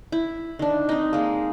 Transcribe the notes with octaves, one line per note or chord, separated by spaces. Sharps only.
E4
D#3 D4
C4 D#4
G#3 A#3